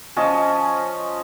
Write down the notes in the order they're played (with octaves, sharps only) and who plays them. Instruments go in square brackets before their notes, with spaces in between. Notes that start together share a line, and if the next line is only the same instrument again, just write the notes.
[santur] F3 C#4 D#5 A5